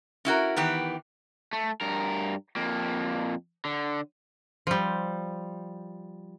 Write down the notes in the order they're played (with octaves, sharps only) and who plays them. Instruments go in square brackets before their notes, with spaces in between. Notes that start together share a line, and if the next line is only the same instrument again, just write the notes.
[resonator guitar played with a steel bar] C#4 E4 F#4 A#4
D#3 E3 B3 G4
[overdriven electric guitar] A3
G2 A#4
F2 A#3
D3
[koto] F3 G3